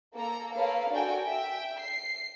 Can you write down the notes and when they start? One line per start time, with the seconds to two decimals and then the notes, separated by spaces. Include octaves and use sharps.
0.15 A#3 A4 A#5
0.54 A#3 A4 B4 C#5 F5
0.91 D4 F#4 A4 A#4 G5 G#5
1.23 E5 G5
1.80 C7